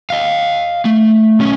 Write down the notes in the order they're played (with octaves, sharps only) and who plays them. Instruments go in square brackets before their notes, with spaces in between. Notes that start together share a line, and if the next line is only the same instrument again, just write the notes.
[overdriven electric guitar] D#5 F5
A3
B1 C#4